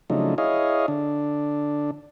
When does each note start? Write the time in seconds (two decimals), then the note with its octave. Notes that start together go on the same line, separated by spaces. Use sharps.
0.10 C#3 F3 F#3 A3 D4 D#4
0.38 E4 G#4 C#5 D#5 F5
0.88 D3 D4